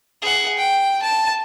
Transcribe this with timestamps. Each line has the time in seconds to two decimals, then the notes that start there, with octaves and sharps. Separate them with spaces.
0.22 G#4 F#5
0.58 G5
1.03 A5